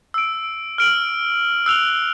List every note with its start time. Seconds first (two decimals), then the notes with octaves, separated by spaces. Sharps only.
0.14 E6 D7
0.78 F6 D7 F#7
1.66 E6 F#6 F7 G7